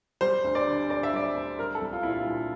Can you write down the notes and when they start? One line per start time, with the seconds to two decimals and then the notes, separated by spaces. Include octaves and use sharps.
0.21 G3 C5
0.44 D2
0.55 D5
0.67 D3
0.90 D2 D5
1.03 E5
1.13 G3 D5
1.35 D2
1.59 G3 A#4
1.75 A4
1.82 C2
1.93 F4
2.03 A#2 E4
2.10 F4
2.27 C2